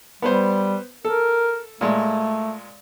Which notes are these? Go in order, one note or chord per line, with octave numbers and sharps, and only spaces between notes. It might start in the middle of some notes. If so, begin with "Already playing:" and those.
G3 B3 B4 C5
A4 A#4
A#2 G#3 A3